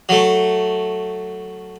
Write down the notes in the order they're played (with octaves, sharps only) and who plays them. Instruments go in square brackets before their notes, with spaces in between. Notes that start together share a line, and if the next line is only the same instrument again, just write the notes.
[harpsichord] F#3 A3